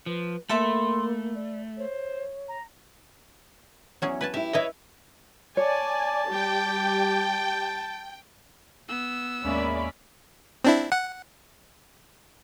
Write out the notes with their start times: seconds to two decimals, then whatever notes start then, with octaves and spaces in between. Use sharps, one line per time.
0.06 F3 B4
0.49 A3 A#3 A4 E5 B5 C6
1.34 D5
1.78 C5 C#5
2.48 A#5
4.02 E2 F#3 C#4 G#4
4.21 B4 G#5 A5
4.34 E4 G4 E5
4.54 E4 B4 C#5 D#5 E5
5.57 C#5 D5 G#5 A5
6.29 G3 G4 G5
8.89 B3 E6
9.44 D#2 G#3 A#3 C4 C#4 D5 E5 B5
10.65 C4 D4 E4
10.92 F#5